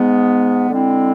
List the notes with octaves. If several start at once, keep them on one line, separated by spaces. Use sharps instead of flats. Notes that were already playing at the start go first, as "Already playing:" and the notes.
Already playing: G#2 G#3 B3
D3 G#3 C4 E4